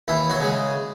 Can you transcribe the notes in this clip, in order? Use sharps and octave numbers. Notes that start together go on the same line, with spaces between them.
D#2 E3 E4
F#3 F#4
C#3 G#3